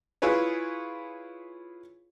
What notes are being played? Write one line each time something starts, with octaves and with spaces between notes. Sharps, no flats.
E4 F4 G#4 B4 C#5